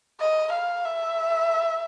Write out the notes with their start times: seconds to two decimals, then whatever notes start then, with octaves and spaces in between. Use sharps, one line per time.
0.20 D#5
0.53 F5
0.85 E5